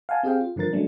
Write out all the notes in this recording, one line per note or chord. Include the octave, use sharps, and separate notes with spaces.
F5 F#5 G#5 A5
C4 G4 G#4 F5 G5
F4
G2 D3 F3 A#4 A6
F#3 G#3 A3 C#4 D4